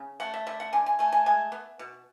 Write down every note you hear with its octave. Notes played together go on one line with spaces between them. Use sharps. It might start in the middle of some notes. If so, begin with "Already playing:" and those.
Already playing: C#3
A3 F#5
E5
D3 E5
F#5
D3 G#5
G#5
A3 G#5
G#5
G#3 G#5
B3
B2